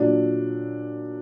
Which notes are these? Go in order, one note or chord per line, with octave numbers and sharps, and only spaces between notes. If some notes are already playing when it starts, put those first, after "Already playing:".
Already playing: A#2 F#3 D4